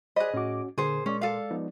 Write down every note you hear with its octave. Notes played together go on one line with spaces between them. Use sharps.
G#4 C5 D5 D#5 B5 F#6
A2 C#4 F#4 D6
A#2 D3 G#4 A#4 C5 C6
G#3 C#4 D5
A4 F5
F3 B3 D#4